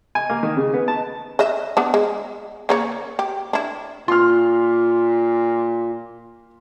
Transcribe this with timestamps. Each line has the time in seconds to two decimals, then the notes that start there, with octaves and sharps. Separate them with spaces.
0.15 G#5
0.30 A#3
0.43 D#3
0.57 C#3
0.74 B3
0.88 A5
1.39 B4 D#5 E5
1.77 B3 D4
1.94 G#3
2.69 C#3 A#3 C#5
3.19 G4
3.53 D4 E4
4.08 A#2 F4 C6 F6